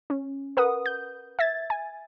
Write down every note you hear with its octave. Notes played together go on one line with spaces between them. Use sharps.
C#4
A#4 B4 F#5 D#6
G6
E5 G#6 A6
G#5